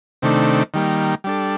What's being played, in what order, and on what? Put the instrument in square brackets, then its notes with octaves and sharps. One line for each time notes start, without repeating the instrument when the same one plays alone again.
[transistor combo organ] C3 D#3 A3 D4
D#3 G3 A#3
G3 D4 A4